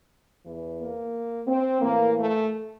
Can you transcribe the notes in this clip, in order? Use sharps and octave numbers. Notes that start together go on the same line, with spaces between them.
E2 E3
A#3
C4
A2 E3 A#3
A3